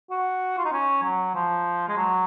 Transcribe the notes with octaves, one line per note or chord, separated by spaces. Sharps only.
F#4
F4
D#4
C#4
F#3
F3
G#3
F#3